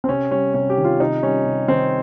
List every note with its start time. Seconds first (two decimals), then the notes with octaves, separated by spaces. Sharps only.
0.04 C4
0.09 C3 C#4
0.31 G3 C#4
0.54 C3 C#4
0.70 G4
0.78 D#3
0.84 F4
1.00 C3 D#4
1.22 G3 C#4
1.46 C3
1.68 D#3 C4